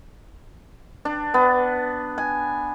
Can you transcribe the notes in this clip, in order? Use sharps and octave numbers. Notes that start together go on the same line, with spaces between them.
D4
B3
G#5